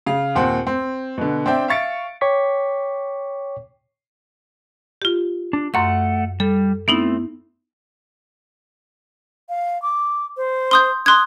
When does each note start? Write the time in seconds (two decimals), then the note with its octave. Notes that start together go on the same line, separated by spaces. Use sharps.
0.06 C#3 F5
0.35 D#2 A#2 C4 F#5
0.67 C4
1.18 B2 D3
1.46 C4 D4 E5 G5
1.68 E5 F5 C#6 A6 C#7 D7
2.21 C#5 G5 C#6 D6 B6
5.02 F4 G4
5.53 D4
5.74 F#2 A3 F#5 C6 C#6
6.40 G3 A4
6.88 A3 B3 C4 D#4 E4
9.49 F5
9.82 D6
10.37 C5
10.71 C6 D#6 G6
11.06 C6 D#6 F#6 G#6